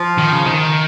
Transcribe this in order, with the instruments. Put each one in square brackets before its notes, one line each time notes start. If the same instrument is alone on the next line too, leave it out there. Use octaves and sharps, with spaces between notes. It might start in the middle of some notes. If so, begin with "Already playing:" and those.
Already playing: [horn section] F3
[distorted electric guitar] D#3
C#3
D#3